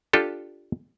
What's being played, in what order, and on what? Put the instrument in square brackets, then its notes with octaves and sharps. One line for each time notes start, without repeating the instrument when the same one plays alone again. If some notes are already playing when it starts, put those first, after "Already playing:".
[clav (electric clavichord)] D4 F4 G4 A4